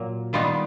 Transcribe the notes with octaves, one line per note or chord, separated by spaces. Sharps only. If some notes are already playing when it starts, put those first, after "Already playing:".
Already playing: A#2 F#3 A#3
D#3 G3 B3 D#4 F4